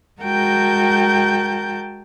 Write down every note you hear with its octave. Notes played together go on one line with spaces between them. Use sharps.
G#3 F#4 A#4 G5 A5 G6